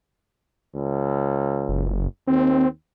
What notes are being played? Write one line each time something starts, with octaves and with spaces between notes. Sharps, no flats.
C#2
F#1
D#2 C4